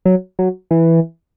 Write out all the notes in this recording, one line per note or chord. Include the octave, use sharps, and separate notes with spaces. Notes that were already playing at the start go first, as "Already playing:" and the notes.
F#3
F#3
E3